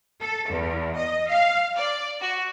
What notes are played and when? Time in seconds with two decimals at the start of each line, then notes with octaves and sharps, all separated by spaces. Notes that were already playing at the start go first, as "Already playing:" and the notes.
0.21 A4
0.49 E2
0.97 D#5
1.29 F5
1.76 D5
2.21 F#4